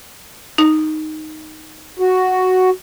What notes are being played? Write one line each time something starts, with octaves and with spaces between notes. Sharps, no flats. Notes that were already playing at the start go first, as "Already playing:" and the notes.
D#4
F#4